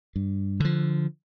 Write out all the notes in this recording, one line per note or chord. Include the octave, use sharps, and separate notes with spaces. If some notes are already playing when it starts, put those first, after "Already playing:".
G2
D3 F3